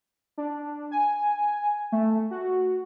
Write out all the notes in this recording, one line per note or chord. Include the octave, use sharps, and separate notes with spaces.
D4
G#5
A3
F#4